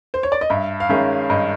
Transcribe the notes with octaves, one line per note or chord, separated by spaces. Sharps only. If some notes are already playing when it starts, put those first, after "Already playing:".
C5
C#5
D5
D#5
G2 E5
F5
D#3 G#3 C#4 E5
G2 D#5